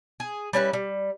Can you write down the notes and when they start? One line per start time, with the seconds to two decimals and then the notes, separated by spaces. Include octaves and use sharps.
0.20 G#4
0.53 G3 C#4 E4 B4
0.73 G3